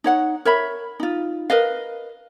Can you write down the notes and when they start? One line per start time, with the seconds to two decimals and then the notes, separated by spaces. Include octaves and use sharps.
0.04 D#4 C#5 F#5
0.45 A#4 C#5 E5 B5
1.00 D#4 F4
1.50 A#4 B4 D#5 F5